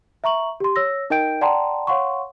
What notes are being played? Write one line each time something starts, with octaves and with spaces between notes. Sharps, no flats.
E5 A#5 C#6 F#7
G4 C6
C#5 E6 A#6
D#4 A#4 D#5 G5 G6 D7
D5 F#5 G5 A5 A#5 C6
C#5 F5 F#5 C6 C#6